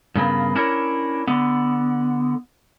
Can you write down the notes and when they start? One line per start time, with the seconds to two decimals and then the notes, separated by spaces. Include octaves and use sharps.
0.15 G2 C#3 A#3 B3
0.55 C#4 D4 E4 A#4 C#5
1.27 D3 B3